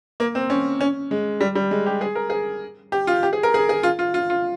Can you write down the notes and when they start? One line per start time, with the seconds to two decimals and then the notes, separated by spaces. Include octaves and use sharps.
0.20 A#3
0.35 C4
0.50 C#4
0.81 C#4
1.11 G#3
1.41 G3
1.55 G3
1.71 G#3
1.86 G4
2.01 G#4
2.15 A#4
2.30 G#4
2.92 G4
3.07 F4
3.23 G4
3.33 G#4
3.43 A#4
3.54 G#4
3.69 G#4
3.83 F4
3.99 F4
4.14 F4
4.30 F4